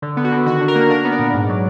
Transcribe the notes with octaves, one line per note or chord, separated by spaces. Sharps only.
D3
B3
F#4
D3
D#3 F#4
D4
A#4
A#3
D4 A#4
B3
D5
A#2
G#2
F#3